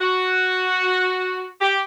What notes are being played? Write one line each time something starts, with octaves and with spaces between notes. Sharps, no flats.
F#4
G4